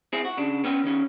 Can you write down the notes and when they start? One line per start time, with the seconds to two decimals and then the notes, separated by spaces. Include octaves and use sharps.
0.13 C4 E4 G#4
0.25 F#4
0.37 C#3 D4
0.64 B3 C#4 G5
0.84 D#3 C#4